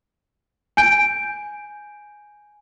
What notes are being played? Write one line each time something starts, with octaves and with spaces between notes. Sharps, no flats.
G#5 G6 D7